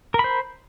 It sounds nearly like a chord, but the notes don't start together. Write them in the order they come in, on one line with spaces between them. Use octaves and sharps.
A#4 B5 C5